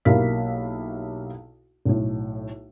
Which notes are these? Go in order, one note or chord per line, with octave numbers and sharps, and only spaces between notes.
B1 A#3 E4 G4 F5 B6
B1 A2